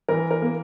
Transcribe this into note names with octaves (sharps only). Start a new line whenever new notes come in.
E3 A#4
A#4
A#3